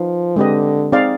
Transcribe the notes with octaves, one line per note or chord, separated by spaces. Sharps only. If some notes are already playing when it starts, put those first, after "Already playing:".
Already playing: F3 D#4 B4 F5
D3 G#3 C4 G4 B4 D#5
C4 D#4 G#4 D5 F5